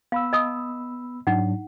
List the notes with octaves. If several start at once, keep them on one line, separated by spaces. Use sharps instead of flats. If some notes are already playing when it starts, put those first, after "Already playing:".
B3 F5 B5 E6
D#5 A5 D#6
G#2 F#3 D4 D#4 F#5